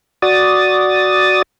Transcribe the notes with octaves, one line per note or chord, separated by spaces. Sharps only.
F#4 D5 D#6 A6